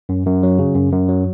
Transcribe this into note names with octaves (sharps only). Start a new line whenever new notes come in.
F#2
F#2
F#3
C#3
F#2
F#2
F#3